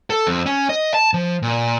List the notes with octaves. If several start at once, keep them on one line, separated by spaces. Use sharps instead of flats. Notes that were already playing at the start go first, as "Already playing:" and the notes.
A4
F2
C#4
D#5
A5
F3
A#2